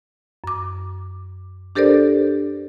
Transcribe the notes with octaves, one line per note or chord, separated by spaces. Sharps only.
F#2 D6
D4 G4 A4 A#4 C5 D5